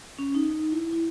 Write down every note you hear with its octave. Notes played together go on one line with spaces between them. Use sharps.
C#4
D#4
E4
E4